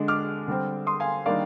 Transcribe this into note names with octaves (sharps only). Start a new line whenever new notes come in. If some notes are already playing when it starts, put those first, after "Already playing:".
Already playing: D3 G#3 D4
D6 F6
D3 G3 C4
C6 D#6
F5 G#5
D#3 G3 A#3 D4 D5 F5